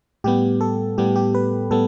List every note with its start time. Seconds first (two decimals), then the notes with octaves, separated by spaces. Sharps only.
0.24 A2 G3 B3 G4
0.61 A4
0.98 A2 G3 B3 G4
1.16 G4
1.35 B4
1.70 A2 G3 B3 A4